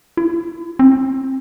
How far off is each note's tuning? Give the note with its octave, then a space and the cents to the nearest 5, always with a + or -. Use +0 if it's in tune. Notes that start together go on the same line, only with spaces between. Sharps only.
E4 +35
C4 +20